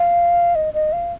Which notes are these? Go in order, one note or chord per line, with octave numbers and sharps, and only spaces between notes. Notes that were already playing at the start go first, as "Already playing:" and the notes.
Already playing: F5
D#5
D#5
F5